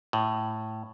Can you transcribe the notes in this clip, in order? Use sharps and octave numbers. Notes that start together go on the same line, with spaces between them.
A2